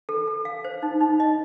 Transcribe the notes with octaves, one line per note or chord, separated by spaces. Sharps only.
A4
A4
F5
C5
D#4
D#4
D#5